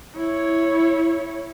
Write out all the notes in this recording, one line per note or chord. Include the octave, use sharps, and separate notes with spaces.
E4 C#5